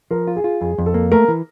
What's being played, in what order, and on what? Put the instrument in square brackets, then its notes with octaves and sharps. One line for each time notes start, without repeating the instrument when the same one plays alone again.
[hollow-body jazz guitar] F3 [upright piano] A#4
[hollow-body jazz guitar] F4
[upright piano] G#4
[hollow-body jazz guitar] F4
[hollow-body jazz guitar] F2 [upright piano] G#4
[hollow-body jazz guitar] F2
[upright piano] A4
[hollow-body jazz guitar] A#3
[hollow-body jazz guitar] A3 [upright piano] A#4
[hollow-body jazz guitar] E3